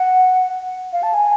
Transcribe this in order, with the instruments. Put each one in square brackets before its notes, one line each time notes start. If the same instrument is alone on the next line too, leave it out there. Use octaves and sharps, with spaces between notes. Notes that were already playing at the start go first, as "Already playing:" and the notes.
Already playing: [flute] F#5
F5
A5
G#5